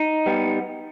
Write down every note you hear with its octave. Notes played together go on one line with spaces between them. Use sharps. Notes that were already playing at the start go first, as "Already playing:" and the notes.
Already playing: D#4
G3 B3